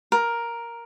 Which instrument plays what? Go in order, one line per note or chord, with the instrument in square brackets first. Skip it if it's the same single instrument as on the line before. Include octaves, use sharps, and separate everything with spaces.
[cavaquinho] A#4